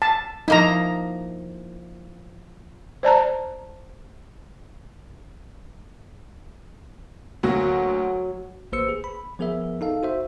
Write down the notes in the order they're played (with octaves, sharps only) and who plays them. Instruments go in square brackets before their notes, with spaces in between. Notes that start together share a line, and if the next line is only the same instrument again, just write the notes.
[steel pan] A5
[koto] F3 A#3 E4 [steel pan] D#4 A#5
[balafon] C5 D5 A5 A#5
[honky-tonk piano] D2 A#3 F#4 [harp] F#3
[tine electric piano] A1 A#3 B4 C5 E6 C#7
G#4
B5
F3 B3 G#4 A#4 E5
D#4 A4 F5
F#4 C5 E5